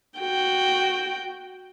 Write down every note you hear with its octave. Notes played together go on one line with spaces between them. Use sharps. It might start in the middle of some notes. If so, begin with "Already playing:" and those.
F#4 G5